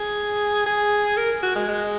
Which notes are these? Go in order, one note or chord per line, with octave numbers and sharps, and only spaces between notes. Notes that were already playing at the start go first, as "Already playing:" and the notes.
Already playing: G#4
G#4
A#4
F#4
G#3
G#3